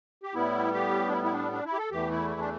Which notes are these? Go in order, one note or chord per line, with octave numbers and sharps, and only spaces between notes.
G4
A2 G3 B3 E4
G4
D4
E4
E4
D4
D4
E4
G4
A4
E2 E3 A3 G4
E4
E4
D4